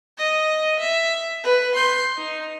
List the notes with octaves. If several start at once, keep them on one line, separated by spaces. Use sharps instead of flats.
D#5
E5
B4
C6 G6
D#4